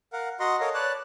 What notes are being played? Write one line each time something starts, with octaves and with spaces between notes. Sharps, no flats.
A#4 F5 F#5
F#4 D#5 F#5 A#5 C6
A4 A#4 C#5 D#5 F5
B4 C#5 D5 A5 F#6